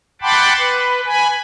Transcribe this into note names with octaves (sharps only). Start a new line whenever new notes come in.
F#5 G5 A5 B5 C6 D6
B4
G#5 B5